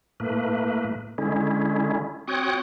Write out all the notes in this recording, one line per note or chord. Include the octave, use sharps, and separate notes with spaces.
A2 A3 A#3 B4
D3 G#3 C#4 E4
C4 F#4 C#5 G5 D#6 F#6